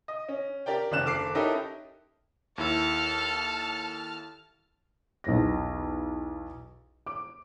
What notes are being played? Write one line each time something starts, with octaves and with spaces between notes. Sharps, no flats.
D#5
C#4
G4 A#4 D5 G5
F#1 C#3 D4 F6 F#6 E7
F#1 A4 D6 C7
C#4 D#4 E4 G4 A4 A#4
D#2 E4 A4 A5 E6 F6
B1 E2 A#6
D6